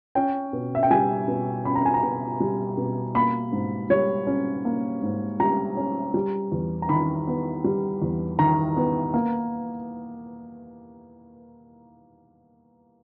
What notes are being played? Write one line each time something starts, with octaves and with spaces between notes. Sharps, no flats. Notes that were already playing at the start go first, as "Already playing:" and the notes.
C#4 G5
B2
E5
G5
G3 G#5
B2
C#4 B5
A#5
G#5
A#5
B2
G3
B2
A#3 B5
G#2
G3 C#5
C#4
A#3
G#2
G3 A#5
C#4
G3
E2
A#5
D#3 B5
B3
G3
E2
D#3 A#5
B3
A#3